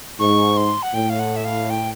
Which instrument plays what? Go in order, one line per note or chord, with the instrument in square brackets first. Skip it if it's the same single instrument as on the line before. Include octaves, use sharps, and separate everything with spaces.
[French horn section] G#2 [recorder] C#6
[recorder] C6
F#5
[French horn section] A2 [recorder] G5
[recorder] F5
F#5
E5
F5
G5